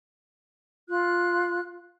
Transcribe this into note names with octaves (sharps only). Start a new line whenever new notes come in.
F4 F#6